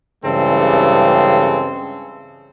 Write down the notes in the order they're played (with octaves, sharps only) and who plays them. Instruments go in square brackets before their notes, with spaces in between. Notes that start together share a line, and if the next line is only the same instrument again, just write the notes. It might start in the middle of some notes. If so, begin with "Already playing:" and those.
[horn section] G2 C#3 E3 G#3 C4 A4